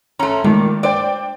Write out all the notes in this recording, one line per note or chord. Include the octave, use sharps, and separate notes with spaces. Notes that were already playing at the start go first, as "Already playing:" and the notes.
A3 C#4 A#5 C6
A#2 D#3 G#3 A3
D4 C5 D5 G5